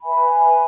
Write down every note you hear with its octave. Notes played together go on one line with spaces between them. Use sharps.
B4 E5 G#5 B5